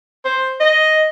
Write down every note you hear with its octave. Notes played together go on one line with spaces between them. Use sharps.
C5
D#5